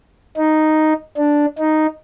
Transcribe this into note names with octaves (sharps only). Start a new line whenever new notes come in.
D#4
D4
D#4